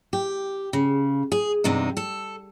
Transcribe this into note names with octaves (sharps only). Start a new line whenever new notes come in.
G4
C#3
G#4
E2 G2 C3 G#3 D#4
A4